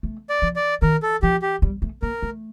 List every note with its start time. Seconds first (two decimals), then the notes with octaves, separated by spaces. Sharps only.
0.03 A3
0.30 D5
0.42 F3
0.56 D5
0.82 D#3 A#4
1.02 A4
1.22 F3 G4
1.42 G4
1.62 G3
1.82 A3
2.02 A#3 A#4
2.22 A3